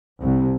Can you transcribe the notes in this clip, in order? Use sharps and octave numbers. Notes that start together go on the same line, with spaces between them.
C2